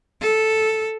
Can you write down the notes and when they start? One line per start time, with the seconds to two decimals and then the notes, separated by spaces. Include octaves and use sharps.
0.21 A4